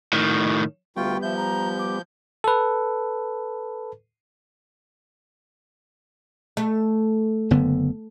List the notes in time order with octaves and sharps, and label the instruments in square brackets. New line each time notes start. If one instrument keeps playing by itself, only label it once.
[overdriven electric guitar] A2 D#3
[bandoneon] D2 F4 G5 [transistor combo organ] G3 B3 [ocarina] C#6
[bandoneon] F3 G6 [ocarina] E5
[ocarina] A#5
D6
[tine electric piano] A4 B4
[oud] A3
[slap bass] F#1 D3 B3